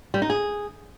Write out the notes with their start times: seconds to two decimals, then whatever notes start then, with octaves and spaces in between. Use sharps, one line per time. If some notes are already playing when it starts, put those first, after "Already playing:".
0.14 G3
0.22 D#4
0.30 G#4